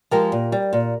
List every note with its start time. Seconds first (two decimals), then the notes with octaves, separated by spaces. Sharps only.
0.11 F3 G#3 G4 A#4
0.32 A#2
0.52 G3
0.73 A#2